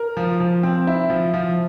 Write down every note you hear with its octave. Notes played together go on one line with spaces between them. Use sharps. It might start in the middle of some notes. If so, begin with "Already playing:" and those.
Already playing: A#4
F3
F3
C4
E4
F3
F3